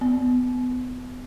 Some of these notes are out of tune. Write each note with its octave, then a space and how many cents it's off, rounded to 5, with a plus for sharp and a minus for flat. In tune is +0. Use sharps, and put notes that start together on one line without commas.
B3 +25